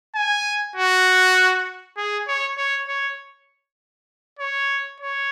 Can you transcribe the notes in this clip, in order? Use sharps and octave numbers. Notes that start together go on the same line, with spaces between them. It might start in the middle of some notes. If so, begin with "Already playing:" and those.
G#5
F#4
G#4
C#5
C#5
C#5
C#5
C#5